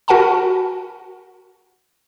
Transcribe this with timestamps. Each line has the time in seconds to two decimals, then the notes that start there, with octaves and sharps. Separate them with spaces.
0.08 F#4 A#4 F#5 G#5 A5 B5